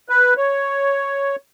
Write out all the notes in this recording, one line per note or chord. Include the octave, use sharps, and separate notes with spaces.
B4
C#5